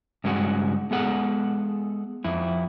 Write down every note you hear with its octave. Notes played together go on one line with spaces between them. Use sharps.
G2 C#3 G#3 F#4
G#3 B3 G#4 A4 F#5
F2 E4